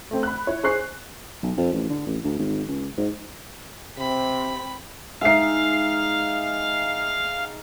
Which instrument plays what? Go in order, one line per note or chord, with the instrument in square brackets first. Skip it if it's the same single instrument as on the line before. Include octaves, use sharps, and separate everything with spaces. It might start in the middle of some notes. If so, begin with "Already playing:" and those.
[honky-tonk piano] A3 C4
B5 F#6
E4 C#5
G#4 C5 C#6 F#6 C7
[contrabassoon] B1
F2
A1
D3
A1
D2
G#1
C#2
G#2
[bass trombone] C3 [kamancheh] C4 [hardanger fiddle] B5
[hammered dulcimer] G#3 D#4 [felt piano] E5 C7 [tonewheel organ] F5